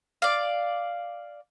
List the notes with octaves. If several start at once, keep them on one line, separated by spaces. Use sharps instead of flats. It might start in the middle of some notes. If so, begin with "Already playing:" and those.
D5 F5